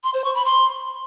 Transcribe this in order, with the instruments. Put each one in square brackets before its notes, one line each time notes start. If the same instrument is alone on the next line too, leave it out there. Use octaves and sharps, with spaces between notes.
[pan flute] C6
C5
C#6
B5
C6